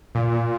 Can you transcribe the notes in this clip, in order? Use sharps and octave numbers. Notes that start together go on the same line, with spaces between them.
A#2